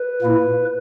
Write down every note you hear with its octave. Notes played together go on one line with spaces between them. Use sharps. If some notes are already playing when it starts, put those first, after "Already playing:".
Already playing: B4
A#2 A#3 E4